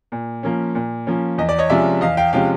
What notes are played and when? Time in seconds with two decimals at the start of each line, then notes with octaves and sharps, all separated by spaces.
0.12 A#2
0.43 F3 A#3 C#4
0.75 A#2
1.07 F3 A#3 C#4
1.38 E2 D#5
1.49 D5
1.59 C#5 D#5
1.70 C3 F3 G#3 C#4 D5 E5
2.01 E2 D#5 F5
2.17 F5 G5
2.33 C3 F3 G#3 C#4 F5 G5